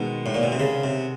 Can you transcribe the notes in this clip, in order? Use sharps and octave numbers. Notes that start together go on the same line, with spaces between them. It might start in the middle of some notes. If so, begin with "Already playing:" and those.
Already playing: B2 D#3 G#3 B3
A2
A#2
B2
C3
C#3
C3